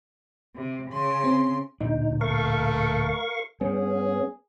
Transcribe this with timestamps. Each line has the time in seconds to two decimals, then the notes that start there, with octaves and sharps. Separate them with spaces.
0.55 C3
0.91 C#3 C6
1.24 C4 C#4
1.81 D1 A#2 D4 D#4
2.21 A3 A#4 F5 C#6
3.61 G2 G3 B3 C#4 G#4